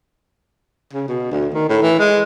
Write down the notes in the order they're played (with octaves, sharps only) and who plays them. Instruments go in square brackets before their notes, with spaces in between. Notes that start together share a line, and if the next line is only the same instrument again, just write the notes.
[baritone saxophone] C#3
B2
D2
D#3
A2
E3
G#3